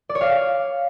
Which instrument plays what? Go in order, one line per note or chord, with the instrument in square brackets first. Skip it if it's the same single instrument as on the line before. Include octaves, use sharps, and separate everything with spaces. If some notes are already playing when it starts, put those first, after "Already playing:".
[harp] D5
C#5
F5